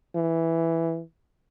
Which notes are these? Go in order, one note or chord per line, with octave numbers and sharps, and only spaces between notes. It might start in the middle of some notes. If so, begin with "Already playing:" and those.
E3